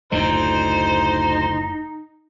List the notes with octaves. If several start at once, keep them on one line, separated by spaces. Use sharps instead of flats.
F#1 D2 A2 D3 D#4 C5